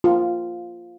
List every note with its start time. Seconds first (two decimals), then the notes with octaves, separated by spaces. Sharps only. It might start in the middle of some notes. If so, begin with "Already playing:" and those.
0.04 F4